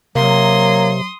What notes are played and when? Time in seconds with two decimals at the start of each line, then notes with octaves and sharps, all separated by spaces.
0.16 C3 F#3 A#3 C6 D#6